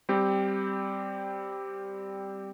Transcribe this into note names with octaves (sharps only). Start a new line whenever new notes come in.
G3 C4 G4